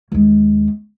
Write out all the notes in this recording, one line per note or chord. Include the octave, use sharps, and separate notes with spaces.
D#2 G#3